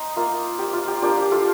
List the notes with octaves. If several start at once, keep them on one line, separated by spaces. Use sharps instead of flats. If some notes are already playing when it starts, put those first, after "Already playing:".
Already playing: D#4 C5 D#5
A#3 F4
G4
F4
G4
A#3 D4 F4 G4
G4
F4 A4